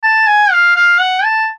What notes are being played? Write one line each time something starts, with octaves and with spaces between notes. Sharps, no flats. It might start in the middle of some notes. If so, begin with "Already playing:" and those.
A5
G#5
F5
F5
F#5
A5